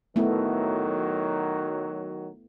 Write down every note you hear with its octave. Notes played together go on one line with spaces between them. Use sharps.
D#3 F#3 A3 B3 E4